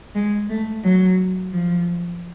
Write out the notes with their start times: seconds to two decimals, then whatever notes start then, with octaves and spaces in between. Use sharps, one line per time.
0.15 G#3
0.50 A3
0.84 F#3
1.53 F3